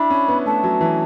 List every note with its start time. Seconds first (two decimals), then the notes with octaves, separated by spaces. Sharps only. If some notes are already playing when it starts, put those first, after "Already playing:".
Already playing: D4 E4 B5
0.10 C#4
0.28 B3
0.46 A3 A5
0.64 F#3
0.81 E3